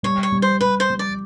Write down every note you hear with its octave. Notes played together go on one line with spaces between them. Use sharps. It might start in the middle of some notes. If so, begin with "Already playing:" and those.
G3 C#5
C#5
G3
C5
G3 B4
C5
G3
D5